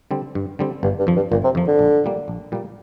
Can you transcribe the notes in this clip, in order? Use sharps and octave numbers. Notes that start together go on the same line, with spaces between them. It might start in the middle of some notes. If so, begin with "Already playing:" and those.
D3 G3 C4
G2
D3 G3 C4
G1 G2
G2
F2 F3
G2
G1 A#2
C3
F2 F3
D3
A#1
A#2 G3 A#3
A#1
A#2 G3 A#3